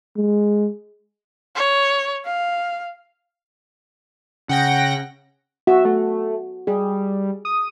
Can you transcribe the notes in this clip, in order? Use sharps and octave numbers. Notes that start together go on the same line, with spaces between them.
G#3
C#5
F5
C#3 F#5 G5 A#6
F#4 E5
A3
G3 G#4
D#6